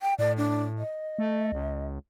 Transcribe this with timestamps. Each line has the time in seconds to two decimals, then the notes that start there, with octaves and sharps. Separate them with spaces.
0.01 G5
0.19 A2 D5
0.37 D4
0.78 D#5
1.19 A3
1.52 C#2